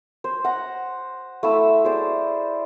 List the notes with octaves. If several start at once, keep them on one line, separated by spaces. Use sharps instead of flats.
C5
F#5 A#5
A3 E4 E6
G#4 C5 D5